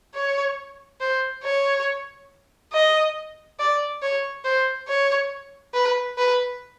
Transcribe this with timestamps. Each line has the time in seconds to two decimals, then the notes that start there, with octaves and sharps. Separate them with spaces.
0.14 C#5
1.01 C5
1.44 C#5
2.73 D#5
3.59 D5
4.02 C#5
4.45 C5
4.88 C#5
5.74 B4
6.18 B4